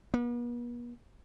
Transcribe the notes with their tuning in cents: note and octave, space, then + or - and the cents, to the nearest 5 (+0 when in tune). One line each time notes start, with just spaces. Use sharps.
B3 -45